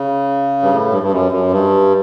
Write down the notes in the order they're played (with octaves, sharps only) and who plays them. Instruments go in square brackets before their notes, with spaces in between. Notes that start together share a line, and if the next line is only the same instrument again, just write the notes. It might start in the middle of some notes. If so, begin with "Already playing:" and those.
Already playing: [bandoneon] C#3
G2
A2
G2
G2
F#2
F#2
G2